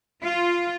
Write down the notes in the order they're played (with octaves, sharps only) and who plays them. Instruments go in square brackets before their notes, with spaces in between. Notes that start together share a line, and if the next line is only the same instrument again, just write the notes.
[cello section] F4